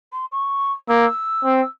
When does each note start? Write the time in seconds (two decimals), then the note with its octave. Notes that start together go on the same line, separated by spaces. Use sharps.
0.12 C6
0.32 C#6
0.88 A#3 E6
1.45 C4